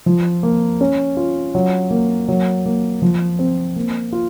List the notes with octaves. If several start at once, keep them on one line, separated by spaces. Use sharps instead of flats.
F3
A#3
C#4
F4
F#3
A#3
F#3
A#3
F3
C4
A#3
F4